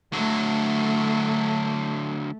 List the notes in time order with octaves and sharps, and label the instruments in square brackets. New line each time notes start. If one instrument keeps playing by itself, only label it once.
[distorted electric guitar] D3 F#3 [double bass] A3